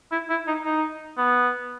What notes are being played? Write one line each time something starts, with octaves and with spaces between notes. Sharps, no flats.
E4
E4
D#4
D#4
B3